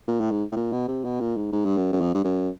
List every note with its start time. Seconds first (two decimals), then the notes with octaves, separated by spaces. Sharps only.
0.08 A#2
0.20 A2
0.31 G#2
0.52 A2
0.56 A#2
0.72 B2
0.88 C3
1.04 B2
1.20 A#2
1.37 G#2
1.52 G#2
1.65 G2
1.77 F#2
1.93 F#2
2.01 F2
2.14 G2
2.24 F#2